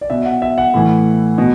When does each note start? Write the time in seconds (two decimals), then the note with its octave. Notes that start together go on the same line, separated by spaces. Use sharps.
0.01 D5
0.10 B2 E5
0.26 F#5
0.42 E5
0.58 F#5
0.74 A2 E3
1.38 B2